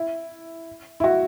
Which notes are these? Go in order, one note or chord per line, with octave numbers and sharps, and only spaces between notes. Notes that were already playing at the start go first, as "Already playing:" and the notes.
Already playing: E4
E4
F#4